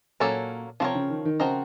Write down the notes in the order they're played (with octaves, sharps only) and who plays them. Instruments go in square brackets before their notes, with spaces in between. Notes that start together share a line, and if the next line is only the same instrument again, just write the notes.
[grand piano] A#2 [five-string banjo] F#3 A#3 C#4 A4
[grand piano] C3 [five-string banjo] F3 C4 F#4 A#4 C#5
[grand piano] C#3
D#3
D#3
[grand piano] C#3 [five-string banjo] F3 C4 F#4 A#4 D#5